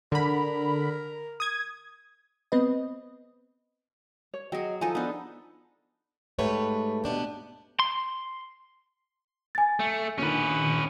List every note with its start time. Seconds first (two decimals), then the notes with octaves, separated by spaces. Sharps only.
0.12 D3 A#4 B5
1.40 D#6 G#6
2.52 B3 C4 B4 D#5
4.34 C#5
4.52 F#3 G#4 D#5 G5
4.81 F3 D#4 A4 G#5
4.95 B3 D4 D#4
6.39 G#2 A3 G4 B4 C#5
7.04 B2 B3 D4 G4
7.80 C6
9.55 G#5 A6
9.80 A3
10.19 A#2 D3 D#3 C#4 B4